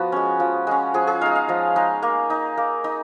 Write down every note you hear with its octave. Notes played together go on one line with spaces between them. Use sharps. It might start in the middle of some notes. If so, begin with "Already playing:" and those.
Already playing: F3 B3 F#4
G#3 C#4
F3
G#3 C#4
F3 G#4
G#4
G#3 D#4 F5
F5
F3 D#5
G#3 D#4
A#3
D#4
A#3
D#4